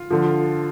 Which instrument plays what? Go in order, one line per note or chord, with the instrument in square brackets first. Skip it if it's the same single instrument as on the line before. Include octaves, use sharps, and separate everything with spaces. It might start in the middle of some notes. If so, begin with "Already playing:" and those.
Already playing: [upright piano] F4
D3 F3